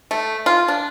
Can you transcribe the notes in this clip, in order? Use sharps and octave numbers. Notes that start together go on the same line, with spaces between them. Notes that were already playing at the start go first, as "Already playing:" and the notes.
A3
F4
D4